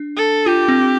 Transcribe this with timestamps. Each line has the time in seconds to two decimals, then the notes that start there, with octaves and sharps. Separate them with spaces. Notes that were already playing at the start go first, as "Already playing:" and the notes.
Already playing: D4
0.17 A4
0.46 F4 G4
0.69 C4